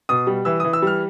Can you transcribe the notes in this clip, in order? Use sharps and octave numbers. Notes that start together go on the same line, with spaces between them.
B2 D#6
G3
E3 E6
E3 D#6
E6
G3 F6